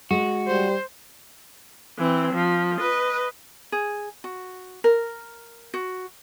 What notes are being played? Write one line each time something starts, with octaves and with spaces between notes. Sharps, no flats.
G#3 F#4
G3 C5
E3 C4
F3
B4 D#5
G#4
F#4
A#4
F#4